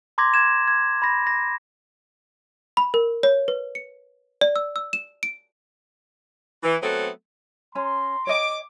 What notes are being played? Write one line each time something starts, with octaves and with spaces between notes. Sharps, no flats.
A#5 C6 D6 G#6 A#6
G#6 E7
G#6
B5 A#6
A#6
B5
A#4
C#5
B4
C#7
D5
E6
E6
E7
D7
E3
F#3 A3 B3 C4 A4
C#4 A#5 C6
C#5 D#5 G5 D6